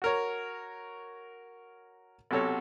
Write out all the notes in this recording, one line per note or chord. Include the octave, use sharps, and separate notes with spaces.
F#4 A#4 C#5
B1 C3 F#4 A4 C#5